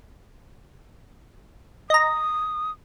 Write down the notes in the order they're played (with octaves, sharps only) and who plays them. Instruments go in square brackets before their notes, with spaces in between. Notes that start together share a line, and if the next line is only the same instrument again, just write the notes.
[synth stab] D#5 A#5 [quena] D#6